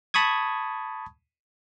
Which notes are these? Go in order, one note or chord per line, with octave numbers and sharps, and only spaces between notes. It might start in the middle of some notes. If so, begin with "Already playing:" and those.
A5 B5 C#6 D#6 G#6